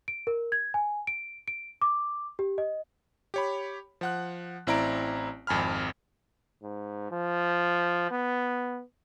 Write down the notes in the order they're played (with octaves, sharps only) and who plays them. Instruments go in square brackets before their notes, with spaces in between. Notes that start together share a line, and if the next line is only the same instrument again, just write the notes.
[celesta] D7
A#4
G#6
G#5
D7
D7
D6
G4
D#5
[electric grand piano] G4 C#5 B5
F3 F#5 F#6
A1 C4 E4 D5 A#5 D7
G#1 F2 G#5 B5 F6
[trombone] G#2
F3
B3